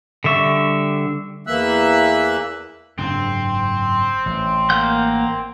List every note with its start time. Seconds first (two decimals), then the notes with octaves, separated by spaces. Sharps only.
0.24 D3 G3 E5 C#6
1.47 E2 E3 A#3 E5 E6 F#6
2.98 F#1 G#2 C4 D4
4.26 A1
4.70 A#3 F#5 G6